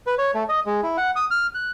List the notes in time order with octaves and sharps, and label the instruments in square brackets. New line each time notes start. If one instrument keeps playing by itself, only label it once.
[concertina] B4
C#5
A3
D#5
G#3
E4
F#5
D#6
F6
F#6